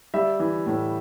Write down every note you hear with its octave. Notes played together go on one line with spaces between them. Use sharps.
G3 E5
E3
A2